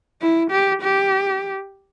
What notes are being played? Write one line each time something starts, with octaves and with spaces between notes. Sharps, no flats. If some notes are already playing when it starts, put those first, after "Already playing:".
E4
G4
G4